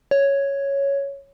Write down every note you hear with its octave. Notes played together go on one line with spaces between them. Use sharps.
C#5